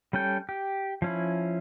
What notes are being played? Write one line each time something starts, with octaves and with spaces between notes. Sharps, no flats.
G3 C#4 A4 G5
G4
F3 C#4 E4